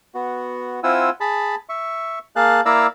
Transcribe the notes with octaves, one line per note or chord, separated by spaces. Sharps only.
B3 F#4
C4 E4 F4 F#5 G#5 E6
G#4 A5 B5
E5 C#6
A#3 G#4 F5 A5 F#6
A#3 E4 D5 F5 A#5 E6